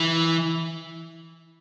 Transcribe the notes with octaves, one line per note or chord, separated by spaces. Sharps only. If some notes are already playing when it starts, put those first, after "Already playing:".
Already playing: E3